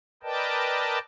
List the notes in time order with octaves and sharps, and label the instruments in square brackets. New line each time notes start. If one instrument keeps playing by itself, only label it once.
[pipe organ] A#4 B4 D5 D#5 G5 A5